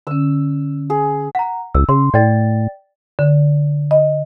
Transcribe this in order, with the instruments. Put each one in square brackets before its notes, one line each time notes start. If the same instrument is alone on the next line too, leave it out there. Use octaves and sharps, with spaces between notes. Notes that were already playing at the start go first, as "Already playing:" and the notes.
[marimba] D3 C#4 [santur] E6
[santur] G#4
[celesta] F#5 A#5
[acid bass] C#2 [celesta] E6
[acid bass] C#3 [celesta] C6
[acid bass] A2 [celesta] D5 G5 A6
[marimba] D3
D#5